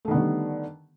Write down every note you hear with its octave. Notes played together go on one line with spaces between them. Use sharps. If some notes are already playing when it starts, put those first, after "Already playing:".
D3 D#3 G3 A3 B3